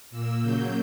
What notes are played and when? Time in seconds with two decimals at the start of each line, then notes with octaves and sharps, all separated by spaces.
0.10 A#2 A#3 E6
0.41 C#3 F#3 A#3 G6